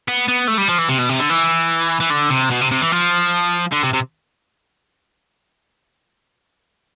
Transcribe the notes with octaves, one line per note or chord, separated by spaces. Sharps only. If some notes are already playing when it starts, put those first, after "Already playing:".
B3
B3
A3
G3
F3
E3
C3
B2
C3
D3
E3
E3
D3
C3
B2
C3
C3
E3
F3
D3
C3
C3